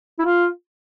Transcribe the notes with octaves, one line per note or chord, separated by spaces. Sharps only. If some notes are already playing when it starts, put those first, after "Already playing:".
E4
F4